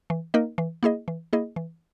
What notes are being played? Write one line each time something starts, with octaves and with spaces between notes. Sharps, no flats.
E3
A#3 D#4 A#4 D#5
E3
A#3 E4 G#4 D#5
E3
A#3 E4 G#4 D#5
E3